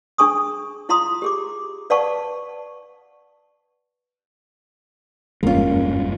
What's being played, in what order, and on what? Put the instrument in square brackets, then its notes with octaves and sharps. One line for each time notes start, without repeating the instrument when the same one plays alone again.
[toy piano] D4 G#4 G#5 C#6 D#6
E4 F4 F5 A#5 C6 D#6
G4 G#4 D6
B4 D5 F5 F#5 A5 C#6
[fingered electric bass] F#1 E2 G2 [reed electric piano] G#3 C#4 [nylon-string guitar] A#3 F4